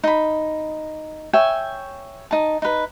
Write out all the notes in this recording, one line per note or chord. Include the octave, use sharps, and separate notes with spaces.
D#4 B5
C#5 E5 G5 G#5
D#4 A5
D#4 B4